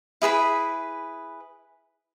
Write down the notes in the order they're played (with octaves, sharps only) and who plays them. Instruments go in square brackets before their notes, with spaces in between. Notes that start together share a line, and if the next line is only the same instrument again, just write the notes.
[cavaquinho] E4 G#4 B4 B5